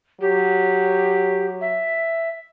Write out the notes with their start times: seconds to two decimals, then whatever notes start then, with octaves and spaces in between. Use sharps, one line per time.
0.21 F#3 G4
1.61 E5